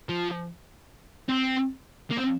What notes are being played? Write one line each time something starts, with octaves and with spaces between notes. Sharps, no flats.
F3
C4
A#3
C4